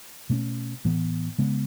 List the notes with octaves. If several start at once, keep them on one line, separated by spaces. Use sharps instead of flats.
B2 A3 C#4
A2 E3 B3
C#3 G#3 B3